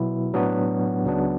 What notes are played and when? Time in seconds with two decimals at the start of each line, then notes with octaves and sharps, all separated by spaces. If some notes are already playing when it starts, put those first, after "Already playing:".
Already playing: B2 F#3 B3 E4
0.33 A2 F#3 B3 D4 F#4
1.04 C#2 C#3 F#3 B3 D4